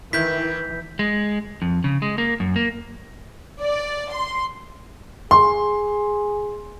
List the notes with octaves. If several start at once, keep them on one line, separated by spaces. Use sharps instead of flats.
D#3 E3 E4 G6 B6
G#3
F2
C#3
G#3
A#3
F#2
A#3
D5
C6
G#4 C6